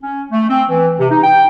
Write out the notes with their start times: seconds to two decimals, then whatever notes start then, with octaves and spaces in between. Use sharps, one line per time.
0.03 C#4
0.32 A3
0.50 C4
0.70 E3
1.00 C3
1.11 D#4
1.24 G5